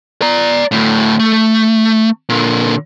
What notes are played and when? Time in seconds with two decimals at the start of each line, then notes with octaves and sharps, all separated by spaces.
0.22 D5 A#5
0.72 D2 A2
1.20 A3
2.29 A#2 D3